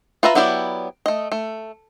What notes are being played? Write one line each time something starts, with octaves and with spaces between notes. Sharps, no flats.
F4 B4 E5 A#5
F#3 B3 E4 G4 D5
A3 D#5
A3